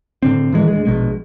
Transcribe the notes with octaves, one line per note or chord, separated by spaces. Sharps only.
A2 D3 C4
A2 D#3 E3 G#3
D2 G#3
A#1 B2 G#3